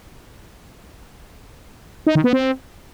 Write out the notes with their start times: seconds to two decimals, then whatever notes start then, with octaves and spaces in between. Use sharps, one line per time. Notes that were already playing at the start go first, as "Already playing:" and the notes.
2.07 D#4
2.15 D#3
2.24 B3
2.33 C4